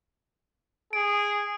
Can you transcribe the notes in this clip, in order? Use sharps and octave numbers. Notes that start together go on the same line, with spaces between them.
G#4 D7